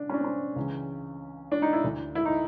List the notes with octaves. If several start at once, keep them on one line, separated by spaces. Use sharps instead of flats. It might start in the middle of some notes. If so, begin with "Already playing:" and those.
Already playing: C#3 D4
C#4
D4
C4
C#4
C#2 C#3 E3
D4
D#4
E4
D2 D3
E4
D#4